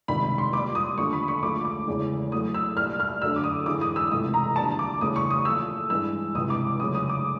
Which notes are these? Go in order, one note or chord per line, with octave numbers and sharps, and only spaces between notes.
C#2 C3 D#3 G3 B5
B5
C6
A#2 G3 D6
D#6
D#2 D3 F3 A3 C#6
B5
C#6
D2 D3 F3 G#3 D6
D6
E2 C#3 E3 G#3
A2 F#3 A3 D#6
E6
C2 A#2 G3 F6
F6
F#2 D3 F#3 A3 E6
D6
D#6
G#2 E3 G#3 D6
D#6
E6
C#2 C3 E3 A3 D#6
A#5
D#2 D3 G3 A5
D6
D2 C#3 E3 G3 D#6
C#6
D#6
A#2 F3 A3 E6
G2 E3 G#3 E6
C#2 C3 E3 D#6
D6
D2 C#3 F#3 D#6
D#6
D6